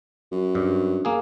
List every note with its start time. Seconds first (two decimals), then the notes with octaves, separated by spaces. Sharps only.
0.32 F#2
0.55 G2
1.05 A#3 G#4